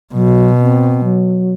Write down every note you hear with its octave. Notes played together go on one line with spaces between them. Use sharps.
B2 F#3
C4
F#3